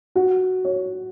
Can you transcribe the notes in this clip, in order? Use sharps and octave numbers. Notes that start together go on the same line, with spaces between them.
F#4
C#5